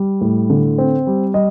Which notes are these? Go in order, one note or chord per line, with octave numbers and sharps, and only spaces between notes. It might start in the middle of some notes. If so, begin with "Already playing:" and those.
Already playing: G3
A2
D3
C4
G3
G3 D#5